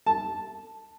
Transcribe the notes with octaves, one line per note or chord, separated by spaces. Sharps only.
A5